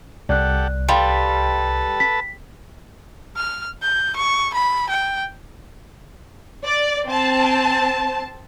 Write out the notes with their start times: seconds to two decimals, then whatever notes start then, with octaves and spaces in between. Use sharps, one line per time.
0.29 C2 G4 A4 D5 F#5 F#6
0.89 G3 A4 B4 F5 A5 B5 C6
2.00 B6
3.36 F6
3.82 G6
4.16 C#6
4.54 B5
4.90 G5
6.65 D5
7.07 C4 A5